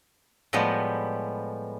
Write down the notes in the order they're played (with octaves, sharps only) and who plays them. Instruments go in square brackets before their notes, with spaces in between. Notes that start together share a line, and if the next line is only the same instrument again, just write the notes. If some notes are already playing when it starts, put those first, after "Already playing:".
[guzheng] A2 F3 G3 G#3 B3